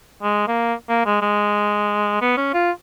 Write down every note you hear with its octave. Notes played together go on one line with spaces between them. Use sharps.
G#3
A#3
A#3
G#3
G#3
B3
C#4
F4